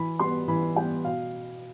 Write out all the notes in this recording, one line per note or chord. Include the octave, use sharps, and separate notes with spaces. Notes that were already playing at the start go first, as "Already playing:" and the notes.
Already playing: E3 B5
G3 B3 C6
E3 B5
G3 B3 G5
B2 F5